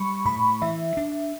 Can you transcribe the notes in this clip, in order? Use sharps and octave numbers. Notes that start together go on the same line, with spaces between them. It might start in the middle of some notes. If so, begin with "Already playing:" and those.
Already playing: G3 B5 C#6
A2 B5
E3 E5
D4